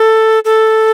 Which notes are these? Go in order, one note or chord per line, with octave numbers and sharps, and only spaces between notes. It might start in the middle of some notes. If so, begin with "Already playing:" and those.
Already playing: A4
A4